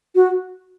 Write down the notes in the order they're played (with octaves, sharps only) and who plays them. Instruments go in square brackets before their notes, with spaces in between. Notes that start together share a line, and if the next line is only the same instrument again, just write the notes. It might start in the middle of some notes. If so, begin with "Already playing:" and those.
[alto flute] F#4